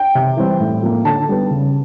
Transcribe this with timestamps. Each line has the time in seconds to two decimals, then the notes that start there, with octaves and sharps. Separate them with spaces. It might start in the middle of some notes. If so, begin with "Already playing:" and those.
Already playing: G5
0.15 C3
0.37 E3 G3 C4
0.60 A2
0.83 F3 A#3
1.05 D3 A5
1.29 G3 B3
1.51 C#3